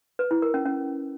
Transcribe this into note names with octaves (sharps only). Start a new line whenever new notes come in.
B4
E4
A#4
C#4
C#4